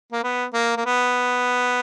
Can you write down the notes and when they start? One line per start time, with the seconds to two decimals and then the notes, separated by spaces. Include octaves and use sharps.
0.12 A#3
0.24 B3
0.54 A#3
0.77 A#3
0.86 B3